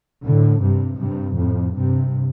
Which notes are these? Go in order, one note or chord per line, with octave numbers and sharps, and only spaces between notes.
A2 D3
G2 C3
G2 C3
F2 A2
G2 C3